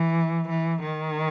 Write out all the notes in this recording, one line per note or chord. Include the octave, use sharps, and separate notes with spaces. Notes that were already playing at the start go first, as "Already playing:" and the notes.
Already playing: E3
E3
D#3